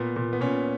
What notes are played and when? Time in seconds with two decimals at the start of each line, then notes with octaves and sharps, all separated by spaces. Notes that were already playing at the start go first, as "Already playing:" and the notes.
Already playing: A#2 B3
0.16 A#2
0.33 B3
0.41 A#2 C#4